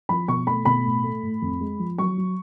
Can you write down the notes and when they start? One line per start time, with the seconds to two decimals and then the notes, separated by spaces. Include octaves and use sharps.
0.09 F3 B5
0.28 B2 C#6
0.47 A3 B5
0.65 B2 B5
0.85 A2
1.04 A3
1.23 A2
1.42 F2
1.61 G#3
1.79 F3
1.98 F#3 C#6
2.18 F#3